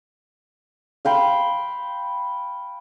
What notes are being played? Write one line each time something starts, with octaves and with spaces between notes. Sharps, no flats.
F5 G5 B5 C6